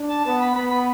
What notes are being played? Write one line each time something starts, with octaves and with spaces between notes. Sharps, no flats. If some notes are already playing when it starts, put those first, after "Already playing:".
Already playing: D4
A5
B3 A5
B5
B3 B5
B5